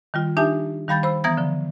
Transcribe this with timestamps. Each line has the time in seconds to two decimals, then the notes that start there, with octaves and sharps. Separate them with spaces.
0.14 D#3 G3 F4
0.37 D4 D#4 G4 E5 G#5 A5
0.88 D#3 G3 F5 B5 G6 A6
1.03 C5 B5 E6
1.24 E3 B3 A#5 D#6 G#6 A#6
1.37 D3 F3